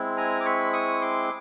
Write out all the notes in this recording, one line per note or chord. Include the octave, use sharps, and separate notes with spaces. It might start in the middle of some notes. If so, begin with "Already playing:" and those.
Already playing: G#3 C4 E4
G#5 A#5
D6
B5 C#6
C#6 D#6
C6 D6